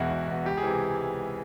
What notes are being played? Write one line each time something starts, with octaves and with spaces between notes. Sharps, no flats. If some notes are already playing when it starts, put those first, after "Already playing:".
Already playing: E1 E2 B2 E4 F#4
E1
E2 B2
C#2 G4
G#4
C3 E3